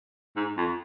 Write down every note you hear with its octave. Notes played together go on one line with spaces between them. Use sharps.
G#2
F2